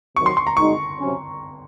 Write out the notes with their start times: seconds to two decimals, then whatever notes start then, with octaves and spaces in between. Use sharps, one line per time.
0.15 C3 D#3 F#3 C#6
0.26 C6
0.37 C6
0.47 A#5
0.57 A#2 G#3 D#4 F#4 C#6
0.99 C3 F#3 C#4